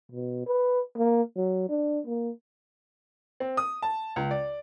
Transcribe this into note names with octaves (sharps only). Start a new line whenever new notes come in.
B2
B4
A#3
F#3
D4
A#3
C4
D#6
A5
C#2
D5